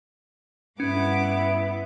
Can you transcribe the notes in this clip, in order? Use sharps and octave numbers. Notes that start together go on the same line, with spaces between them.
G2 B3 C#4 E4 F#5 D6